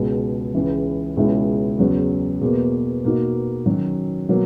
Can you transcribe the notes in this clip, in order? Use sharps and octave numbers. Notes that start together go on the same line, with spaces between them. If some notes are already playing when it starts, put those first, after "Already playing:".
Already playing: C#2 B2 G#3
C#2 C#3 E3
C#2 B2 G#3 C#4 E4
E2 C#3 F#3
E2 B2 A#3
B2 A#3 D#4 F#4
D#3 F#3 C#4 F#4
B2 F#3 A#3